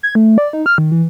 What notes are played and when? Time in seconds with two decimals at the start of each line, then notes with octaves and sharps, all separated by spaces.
0.03 G#6
0.15 A3
0.38 D5
0.53 D#4
0.66 F6
0.78 D#3
0.92 E3